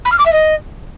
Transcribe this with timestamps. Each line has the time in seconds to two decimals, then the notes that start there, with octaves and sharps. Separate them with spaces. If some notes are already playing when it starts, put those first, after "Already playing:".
0.05 B5
0.12 F6
0.18 D6
0.25 E5
0.32 D#5